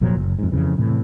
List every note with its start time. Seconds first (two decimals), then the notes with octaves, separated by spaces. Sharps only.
0.01 F1 A#2 F3 F#3
0.15 F#1
0.39 F2 G#2
0.52 F2 C#3 E3
0.78 A2 C3 E3